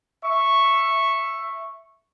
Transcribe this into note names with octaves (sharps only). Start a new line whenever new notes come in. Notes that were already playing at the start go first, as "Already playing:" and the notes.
E5 C#6